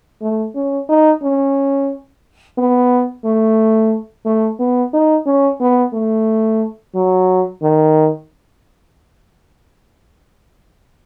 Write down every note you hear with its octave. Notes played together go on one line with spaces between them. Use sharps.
A3
C#4
D#4
C#4
B3
A3
A3
B3
D#4
C#4
B3
A3
F#3
D#3